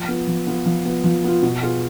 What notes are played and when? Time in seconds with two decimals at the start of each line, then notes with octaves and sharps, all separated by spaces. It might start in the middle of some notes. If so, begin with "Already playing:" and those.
Already playing: F3
0.08 B3 F4
0.27 F3
0.47 B3 F4
0.66 F3
0.85 B3 F4
1.04 F3
1.24 B3 F4
1.43 B2
1.62 B3 F4 G#4